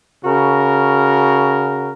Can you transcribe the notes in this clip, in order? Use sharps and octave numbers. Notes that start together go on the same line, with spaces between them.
C#3 F#4 A#4